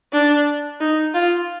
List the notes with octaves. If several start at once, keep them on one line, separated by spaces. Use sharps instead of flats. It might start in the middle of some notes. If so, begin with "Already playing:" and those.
D4
D#4
F4